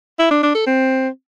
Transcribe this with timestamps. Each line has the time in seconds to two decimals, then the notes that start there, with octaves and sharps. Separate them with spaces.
0.19 E4
0.31 D4
0.43 D4
0.55 A4
0.67 C4